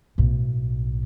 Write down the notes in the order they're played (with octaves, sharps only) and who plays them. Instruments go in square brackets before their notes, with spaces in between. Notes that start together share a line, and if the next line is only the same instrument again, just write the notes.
[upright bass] B1 A2